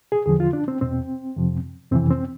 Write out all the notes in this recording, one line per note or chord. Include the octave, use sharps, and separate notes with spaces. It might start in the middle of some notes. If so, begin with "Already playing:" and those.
G#4
E2 D3 F3 G#4
F4
D4
C4
E2 B2 C4
F2 C3 F3
F2 C3 E3 C4
C4